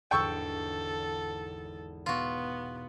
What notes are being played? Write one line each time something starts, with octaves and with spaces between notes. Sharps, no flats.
G#1 E2 D3 A4 G5 C#6 E6
B2 B3 F4 F#4